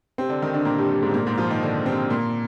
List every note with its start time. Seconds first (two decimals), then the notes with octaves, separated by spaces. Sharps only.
0.18 C3 C4
0.29 D3 D4
0.42 D#3 D#4
0.54 D3 D4
0.65 A#2 A#3
0.77 G2 G3
0.90 G2 G3
1.02 G#2 G#3
1.09 C4
1.14 A#2 A#3
1.26 G#2 G#3
1.38 F3 F4
1.50 D#3 D#4
1.62 D3 D4
1.86 C3 C4
2.10 A#2 A#3